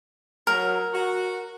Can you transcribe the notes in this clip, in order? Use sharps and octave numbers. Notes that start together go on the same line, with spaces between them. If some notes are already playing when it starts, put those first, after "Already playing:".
F#3 A#4
F#4